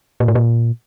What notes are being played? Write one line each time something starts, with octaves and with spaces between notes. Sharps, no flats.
A#2
A2
A#2